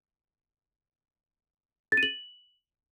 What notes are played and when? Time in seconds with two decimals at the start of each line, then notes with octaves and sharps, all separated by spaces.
1.92 A6
1.97 D#7
2.03 F#7